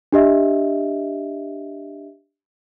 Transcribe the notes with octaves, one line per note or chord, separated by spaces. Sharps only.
D4 G4 D#5 E5